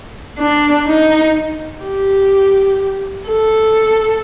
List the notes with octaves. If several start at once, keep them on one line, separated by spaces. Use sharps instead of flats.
D4
D#4
G4
A4